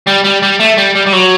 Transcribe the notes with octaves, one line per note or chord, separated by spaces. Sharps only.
G3
G3
G3
A3
G3
G3
G3
F#3